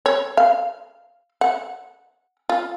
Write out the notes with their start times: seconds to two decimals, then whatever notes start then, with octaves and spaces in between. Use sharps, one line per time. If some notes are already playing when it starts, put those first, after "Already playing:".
0.06 C#5
0.37 F5
1.41 F#5
2.49 F4